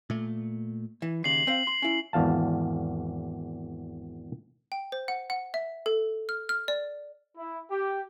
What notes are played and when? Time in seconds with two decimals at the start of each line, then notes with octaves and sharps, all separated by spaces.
0.10 A#2 A3
1.02 E3
1.24 D#2 C#3 C7 F#7
1.47 C4 C5 F5
1.67 C6
1.82 C#4 E4
2.13 G#1 E2 F5 A5
4.72 G5
4.92 C5
5.08 F#5
5.30 F#5
5.54 E5
5.86 A4
6.29 F6
6.49 F6
6.68 D5
7.37 E4
7.70 G4